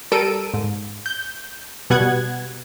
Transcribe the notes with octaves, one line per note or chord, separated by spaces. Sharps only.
G3 A4 A#4 E6 D7 D#7
G#2
G6
B2 G3 B3 F#5 F#6 G#6